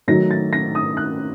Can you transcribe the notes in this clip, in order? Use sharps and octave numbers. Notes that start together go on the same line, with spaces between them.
D#3 F#3 A3 D#4 A#6
A6
A#6
D#6
F#6